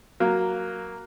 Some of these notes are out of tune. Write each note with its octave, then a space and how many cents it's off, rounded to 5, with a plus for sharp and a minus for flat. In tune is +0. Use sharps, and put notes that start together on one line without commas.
F#3 +0 A#3 +0